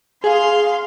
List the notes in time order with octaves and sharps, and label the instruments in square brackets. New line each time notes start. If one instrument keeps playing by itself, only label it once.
[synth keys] G#4 [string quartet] F5 C6